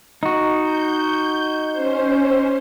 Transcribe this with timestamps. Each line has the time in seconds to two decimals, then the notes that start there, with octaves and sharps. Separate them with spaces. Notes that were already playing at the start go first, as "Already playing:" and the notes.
0.23 D#4 F#4
0.62 G6
1.72 C#4 C5